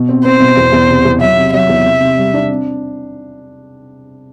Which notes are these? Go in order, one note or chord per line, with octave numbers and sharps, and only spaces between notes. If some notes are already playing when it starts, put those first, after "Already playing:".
Already playing: B2
C4
C4 C5
B2
E2
E2
C3
E2
F#3 E5
C3
F#3 E5
E2
C3
C3
G3
D4
C4